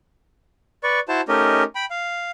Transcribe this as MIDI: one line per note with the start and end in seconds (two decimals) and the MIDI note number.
0.83 1.00 71
0.83 1.00 74
0.83 1.00 85
1.08 1.21 64
1.08 1.21 66
1.08 1.21 72
1.08 1.21 81
1.28 1.64 57
1.28 1.64 61
1.28 1.64 63
1.28 1.64 67
1.28 1.64 70
1.28 1.64 75
1.75 1.85 79
1.75 1.85 83
1.91 2.31 77